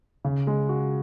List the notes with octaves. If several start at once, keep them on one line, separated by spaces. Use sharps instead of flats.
C#3
G#3
F#4